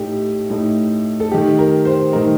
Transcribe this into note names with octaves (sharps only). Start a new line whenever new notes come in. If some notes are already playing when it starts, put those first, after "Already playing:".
Already playing: A2 A3 D#4 G4
A2 A3 D#4
A4
D#3 A3 D#4 G4
A#4
C5
D#3 A3 D#4 A#4